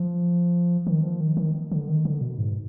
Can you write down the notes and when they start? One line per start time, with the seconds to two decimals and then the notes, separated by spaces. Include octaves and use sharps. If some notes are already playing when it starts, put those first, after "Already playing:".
Already playing: F3
0.87 D#3
1.03 F3
1.20 D#3
1.37 D#3
1.71 D3
1.88 D#3
2.05 D3
2.21 B2
2.38 G#2